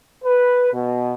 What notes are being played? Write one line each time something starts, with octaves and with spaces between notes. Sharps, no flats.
B4
B2